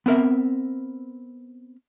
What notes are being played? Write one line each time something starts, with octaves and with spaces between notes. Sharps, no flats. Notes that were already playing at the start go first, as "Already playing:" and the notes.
B3 C4 A#4 E5